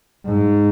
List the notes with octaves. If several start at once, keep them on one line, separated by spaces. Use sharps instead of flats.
G#2